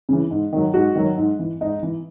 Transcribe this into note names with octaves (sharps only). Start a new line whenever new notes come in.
C#3 E3
G#2
D#3 F#3
G#2 F#4
D#3 F#3
G#2
E3
G#2 D#4
E3